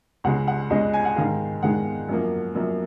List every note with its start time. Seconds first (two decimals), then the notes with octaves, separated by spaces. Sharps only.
0.24 C#2 C#3 G#3 F#5
0.47 F#5
0.70 C#2 C#3 G#3 D#5
0.93 G#5
1.05 F#5
1.16 G#2 D#3 G#3 F5
1.62 G#2 D#3 G#3 F#5
2.09 F#2 F3 A#3
2.55 F#2 F3 A#3